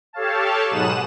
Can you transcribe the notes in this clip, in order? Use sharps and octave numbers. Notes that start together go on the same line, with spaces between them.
G4 A4 C#5 F5 A5
G#2 B2 F#3 D#6 F#6 E7